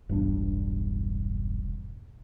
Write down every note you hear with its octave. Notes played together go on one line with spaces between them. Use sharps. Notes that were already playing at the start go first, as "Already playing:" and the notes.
E1 B1 G2 D4